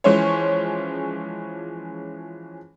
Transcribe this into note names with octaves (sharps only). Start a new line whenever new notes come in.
E3 F3 G#3 C#4 C5 C#5